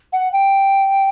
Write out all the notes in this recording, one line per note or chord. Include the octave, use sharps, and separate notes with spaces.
F#5
G5